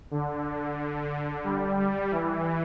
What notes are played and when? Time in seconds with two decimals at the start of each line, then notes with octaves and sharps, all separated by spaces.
0.11 D3
1.44 G3
1.77 G3
2.11 E3